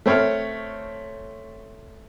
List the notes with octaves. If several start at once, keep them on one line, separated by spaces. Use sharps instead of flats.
A3 C4 C#5 F6